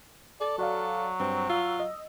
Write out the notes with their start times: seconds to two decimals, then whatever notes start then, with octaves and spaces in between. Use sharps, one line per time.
0.41 A4 D5
0.58 F#3 F#4 D5 F5
1.20 G2 C4
1.49 F4 E6
1.80 D#5